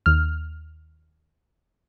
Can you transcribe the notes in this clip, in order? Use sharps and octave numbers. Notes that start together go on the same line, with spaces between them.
D#2 F6